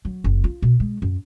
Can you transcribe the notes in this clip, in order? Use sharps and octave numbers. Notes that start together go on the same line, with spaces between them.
F#3
F#1
F4
B2
G#3
F#2